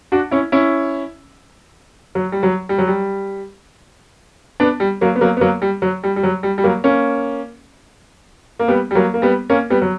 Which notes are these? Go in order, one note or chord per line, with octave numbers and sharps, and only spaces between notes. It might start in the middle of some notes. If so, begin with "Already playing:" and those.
D4 F#4
C#4 E4
C#4 E4
F#3
G3
F#3
G3
F#3
G3
B3 D4
G3
F#3 A#3
B3
F#3 A#3
B3
F#3 A#3
G3
F#3
G3
G3
F#3
G3
G3
F#3 A#3
A#3 C#4
A#3
G3 B3
G3
F#3 A#3
A#3
G3 B3
A#3 C#4
G3 B3
F#3